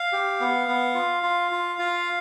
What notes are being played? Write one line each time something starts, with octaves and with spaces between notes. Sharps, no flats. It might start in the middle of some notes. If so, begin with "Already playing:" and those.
Already playing: F5
G4
B3
B3
F4
F4
F4
F4